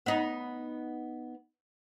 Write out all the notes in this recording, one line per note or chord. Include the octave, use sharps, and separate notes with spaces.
B3 D#4